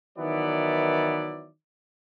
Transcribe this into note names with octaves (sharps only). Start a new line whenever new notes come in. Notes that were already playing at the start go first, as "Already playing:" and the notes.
D#3 E3 F#3 B3 E4 D5